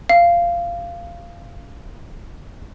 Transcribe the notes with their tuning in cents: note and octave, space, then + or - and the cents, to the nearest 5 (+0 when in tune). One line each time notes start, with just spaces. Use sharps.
F5 -15